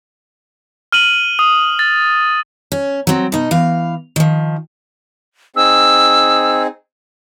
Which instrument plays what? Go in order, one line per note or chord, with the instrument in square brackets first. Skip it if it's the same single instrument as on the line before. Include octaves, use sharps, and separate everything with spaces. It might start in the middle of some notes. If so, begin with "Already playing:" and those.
[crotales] F6 D#7 F#7
D#6
A6
[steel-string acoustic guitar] C#4
F#3 C4
B2 D#4
E3 F5
D#3 F3
[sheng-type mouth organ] C4 D#4 G#4 [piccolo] E6